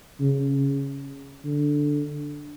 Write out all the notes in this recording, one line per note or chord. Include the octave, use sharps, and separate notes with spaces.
C#3
D3